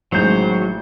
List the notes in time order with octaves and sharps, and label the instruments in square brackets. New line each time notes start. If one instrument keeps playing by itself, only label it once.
[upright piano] A1 G6 [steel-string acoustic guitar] D#2 G#3 [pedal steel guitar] F#3 [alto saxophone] C5